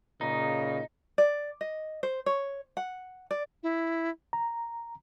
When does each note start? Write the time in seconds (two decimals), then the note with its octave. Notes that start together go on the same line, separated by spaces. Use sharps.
0.21 A#2 C#3 D#4
1.18 D5
1.61 D#5
2.03 C5
2.26 C#5
2.77 F#5
3.31 D5
3.63 E4
4.33 A#5